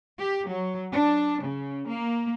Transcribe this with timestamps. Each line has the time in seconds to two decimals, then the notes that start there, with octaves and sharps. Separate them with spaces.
0.19 G4
0.48 F#3
0.91 D4
1.42 C#3
1.88 A#3